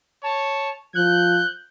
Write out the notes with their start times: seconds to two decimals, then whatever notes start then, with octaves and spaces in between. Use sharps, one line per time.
0.23 C#5 A5
0.95 F3 F#6 G6